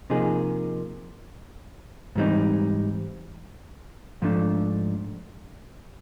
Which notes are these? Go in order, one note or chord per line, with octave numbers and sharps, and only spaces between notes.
C3 F3 A#3 D#4 G#4
G#2 E3 G3 C4 D#4
G#2 F3 A3 D4